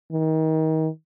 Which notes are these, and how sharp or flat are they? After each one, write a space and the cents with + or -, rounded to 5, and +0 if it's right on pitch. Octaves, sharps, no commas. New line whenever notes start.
D#3 +30